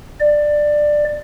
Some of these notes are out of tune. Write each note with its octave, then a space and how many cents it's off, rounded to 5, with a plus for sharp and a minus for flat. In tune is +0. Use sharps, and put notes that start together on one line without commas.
D5 +15